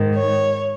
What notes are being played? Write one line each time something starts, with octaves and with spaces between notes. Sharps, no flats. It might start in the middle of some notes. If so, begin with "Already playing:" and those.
Already playing: G#2 D#3
C#5